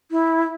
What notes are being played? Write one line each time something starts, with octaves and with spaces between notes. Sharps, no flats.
E4